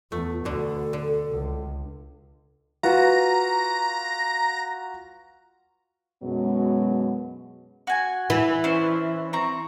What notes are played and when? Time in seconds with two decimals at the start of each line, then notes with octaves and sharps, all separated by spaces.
0.12 E2 A3 F4
0.45 D2 B2 D3 A4
0.93 D3
1.30 C#2
2.83 F4 F#4 B4 A#5
6.22 F#2 B2 F#3 G#3 B3
7.87 F#4 G#5
8.30 E3
8.64 C#4 D4 C5
9.33 C4 A#5 C#6